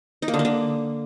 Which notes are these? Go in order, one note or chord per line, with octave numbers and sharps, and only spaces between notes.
D#4
A#3
D3
A#3
D3